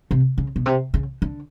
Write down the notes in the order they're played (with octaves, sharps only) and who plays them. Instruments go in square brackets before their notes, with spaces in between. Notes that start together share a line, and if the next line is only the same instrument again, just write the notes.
[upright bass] C3
C#3
B2
C3
C#3
D3